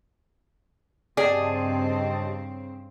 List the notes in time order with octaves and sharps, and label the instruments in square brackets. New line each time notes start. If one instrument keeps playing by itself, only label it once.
[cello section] G2 C#3 C4 [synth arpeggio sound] G4 D#5 A5 [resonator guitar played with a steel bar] G#4 [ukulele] D5